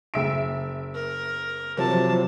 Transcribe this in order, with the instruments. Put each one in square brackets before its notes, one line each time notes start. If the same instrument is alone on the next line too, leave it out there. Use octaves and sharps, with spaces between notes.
[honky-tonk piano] F#1 E5 D7
[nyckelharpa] A#4
[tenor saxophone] C3 [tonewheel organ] F3 F#3 [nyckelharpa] A5